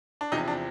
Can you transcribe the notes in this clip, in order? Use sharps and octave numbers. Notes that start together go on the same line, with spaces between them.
D4
E2 C3 F3 D#4
D4